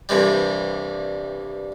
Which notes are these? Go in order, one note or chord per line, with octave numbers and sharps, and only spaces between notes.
C2 G2 E3 G3